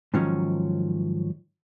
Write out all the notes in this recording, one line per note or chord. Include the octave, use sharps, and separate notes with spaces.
G#2 D#3 F3 F#3 C#4